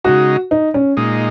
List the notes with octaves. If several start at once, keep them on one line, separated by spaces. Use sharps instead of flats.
C#3 G#3 D#4 F#4
D#4
C#4
A#2 G#3 D#4